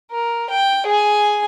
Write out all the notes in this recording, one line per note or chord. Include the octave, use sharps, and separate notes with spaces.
A#4
G5
G#4 G#5